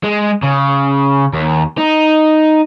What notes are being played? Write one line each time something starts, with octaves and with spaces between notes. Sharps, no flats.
G#3
C#3
D#2
D#4